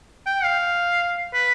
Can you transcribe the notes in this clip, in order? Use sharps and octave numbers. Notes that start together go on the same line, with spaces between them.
G5
F5
B4